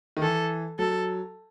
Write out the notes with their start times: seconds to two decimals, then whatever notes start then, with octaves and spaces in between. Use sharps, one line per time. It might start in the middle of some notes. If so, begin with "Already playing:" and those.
0.17 D#3
0.22 E3 A4
0.79 F#3 A4